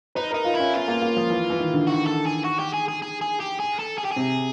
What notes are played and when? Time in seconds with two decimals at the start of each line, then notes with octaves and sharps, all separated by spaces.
0.15 D#4 B4
0.31 D#4 A#4
0.44 F4
0.54 E4
0.59 C#4
0.74 B3 F4
0.88 A#3
1.02 A#3
1.17 F3
1.30 E3
1.50 E3
1.59 D#3
1.73 D3
1.87 D#3 F#4
2.07 A4
2.26 G#4
2.44 F#4
2.59 G4
2.73 G#4
2.88 G#4
3.02 G#4
3.22 G#4
3.40 G4
3.60 G#4
3.79 A4
3.98 G#4
4.05 G4
4.12 C3 G#4